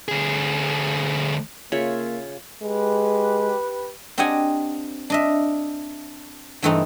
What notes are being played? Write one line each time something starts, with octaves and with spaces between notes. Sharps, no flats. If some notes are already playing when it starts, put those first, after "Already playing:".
D2 G#4
C#3 A#3 F4 C#5 E5
G#3 G4 B4
C4 D4 G4 D#5 F#5 G#5
D4 D#5 E5
G2 C3 E3 A3 C4 D#4